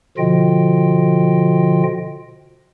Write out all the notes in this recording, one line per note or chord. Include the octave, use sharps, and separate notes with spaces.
B2 D3 F3 F4 D#5 G5